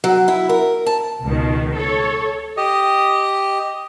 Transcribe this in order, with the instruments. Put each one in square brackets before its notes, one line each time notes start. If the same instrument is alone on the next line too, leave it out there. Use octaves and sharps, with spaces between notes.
[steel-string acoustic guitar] F#3
E4
A#4
A5
[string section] C#2 B2 D#3
A4 C#5
[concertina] G4 D#5